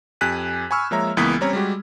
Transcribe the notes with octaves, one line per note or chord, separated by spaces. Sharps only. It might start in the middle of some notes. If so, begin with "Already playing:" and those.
F2 G4 G#5 F#6 B6 D#7
G#5 B5 C#6 E6 F6
F3 G#3 A#3 C#5 E5 A#5
C#2 E3 A#3 B3 D#6 B6
G3 C4 C#4 C#5 A#5 G#6
G3 G#3 F#4 G4